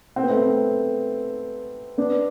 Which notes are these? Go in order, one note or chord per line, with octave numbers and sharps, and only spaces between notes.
C4
B3
A3 C4
B3 D4